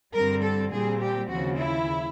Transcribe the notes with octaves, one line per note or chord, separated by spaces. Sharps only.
G2 D3 G3 C4 A#4
A4
A#2 G3 C4 G#4
G4
D#2 C#3 F3 F#4
E4